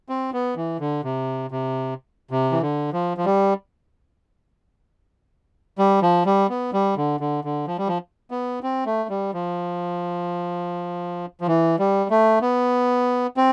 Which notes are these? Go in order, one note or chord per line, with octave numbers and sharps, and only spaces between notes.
C4
B3
E3
D3
C3
C3
C3
E3
D3
F3
F3
G3
G3
F3
G3
B3
G3
D3
D3
D3
F3
G3
F3
B3
C4
A3
G3
F3
F3
E3
G3
A3
B3
C4